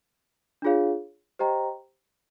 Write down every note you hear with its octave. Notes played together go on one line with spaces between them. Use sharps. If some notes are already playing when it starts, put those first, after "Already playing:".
D4 F4 G#4 C#5 F5
G4 C5 D#5 G5 A#5